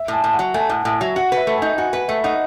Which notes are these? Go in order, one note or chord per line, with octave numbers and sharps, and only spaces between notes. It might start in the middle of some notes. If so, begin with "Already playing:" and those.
Already playing: E5
A2
G#5
A2
F#5
F#3
A3 G#5
A2 F#5
A2 G#5
F#3 E5
F#4 F#5
B4
E5
A3
D#4 G#5
F#4 G#5
B4 F#5
A3 E5
D#4 F#5